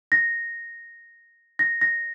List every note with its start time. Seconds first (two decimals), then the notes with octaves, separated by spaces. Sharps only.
0.12 A#6
1.59 A#6
1.81 A#6